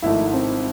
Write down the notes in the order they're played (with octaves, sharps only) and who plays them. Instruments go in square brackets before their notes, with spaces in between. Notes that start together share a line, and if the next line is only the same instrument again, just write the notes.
[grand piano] G#1 G#2 F3 A3 [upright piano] E4
[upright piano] C4